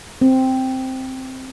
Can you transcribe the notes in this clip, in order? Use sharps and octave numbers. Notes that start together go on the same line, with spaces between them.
C4